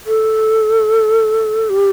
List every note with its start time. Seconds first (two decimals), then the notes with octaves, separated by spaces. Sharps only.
0.07 A4
1.70 G4